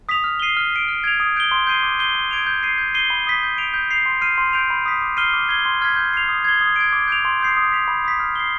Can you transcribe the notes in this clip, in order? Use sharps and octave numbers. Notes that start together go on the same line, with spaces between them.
D#6 B6 F7
F6
C7 D#7 G7
F6
B6 D7
F6
G#6 D7 F7
D#6
G6 D7 G7
C6
G6 C7 D#7 G7
D6
G6 C7 D#7 G7
C6
D#6 G#6 D7 F7
G6
C7 D#7
G6
C7 D#7 G7
B5
D#6 B6
G6
D7 F7
G6
C7 F7
C6
F6 C7 D#7
C6
G6 D7 F7
B5
D#6 B6
D6
F6 C7 D#7 G7
D6
G#6 C7 G7
C6
F6 G#6 B6
G6
C7 F7
D#6
G#6 C7 G7
D#6
G#6 D7
D6
G6 D7 F7
C6
D#6 G6 C7
D#6
B6 F7
B5
D#6 B6
F6
C7 G7